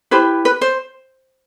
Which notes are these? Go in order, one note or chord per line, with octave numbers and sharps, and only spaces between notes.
E4 G4 B4 C5
B4
C5